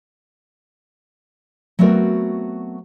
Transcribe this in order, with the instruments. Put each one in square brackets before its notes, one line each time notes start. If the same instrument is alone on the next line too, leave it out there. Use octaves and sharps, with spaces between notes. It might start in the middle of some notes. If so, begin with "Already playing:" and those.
[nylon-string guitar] F#3 A3 B3 C4 F#4 A#4